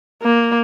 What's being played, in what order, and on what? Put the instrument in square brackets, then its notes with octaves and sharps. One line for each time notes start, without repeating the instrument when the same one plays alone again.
[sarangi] A#3